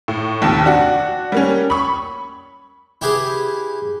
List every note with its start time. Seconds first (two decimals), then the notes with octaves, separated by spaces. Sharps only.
0.08 A2
0.42 A#1 D#2 C3 A5
0.66 D4 F#4 F#5
1.32 G3 A#3 C#4
1.70 B5 C#6
3.02 E4 G4 G#4 B4